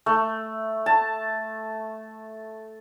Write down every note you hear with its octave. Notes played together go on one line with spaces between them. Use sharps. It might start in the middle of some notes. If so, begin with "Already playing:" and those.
A3
A5